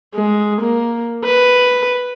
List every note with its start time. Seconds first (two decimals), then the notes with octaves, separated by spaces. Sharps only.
0.14 G#3
0.62 A#3
1.25 B4